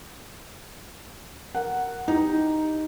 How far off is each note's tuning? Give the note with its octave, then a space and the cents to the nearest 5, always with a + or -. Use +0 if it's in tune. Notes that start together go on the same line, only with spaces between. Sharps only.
A#4 +0 F#5 +0
D#4 +0 G4 +0